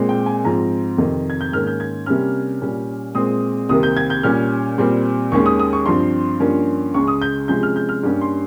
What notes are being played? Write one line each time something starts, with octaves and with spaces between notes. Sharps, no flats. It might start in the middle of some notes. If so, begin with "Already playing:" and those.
Already playing: A#2 G#3 C4
G5
G#5
G#2 F3 C4 A#5
F2 C3 D#3
G#6
G6
G#2 D#3 A#3 C#4 F6
G6
G#6
C3 G3 A#3 C#4 F6
A#2 G3 C#4
A#2 G#3 C4 D#6
C2 C3 D#3 A#3 D#6
G6
G#6
G6
A#2 G3 C#4 F6
A#2 G3 C4
D#2 D#3 G#3 C#4 C#6
D#6
D#6
C#6
G2 F3 C4 C6
G2 F3 A#3 C#4
C#2 C#3 G#3 C#6
D#6
G6
C3 F3 G#3 C#4 G6
F6
G6
F6
G2 G3 A#3 C#4
C6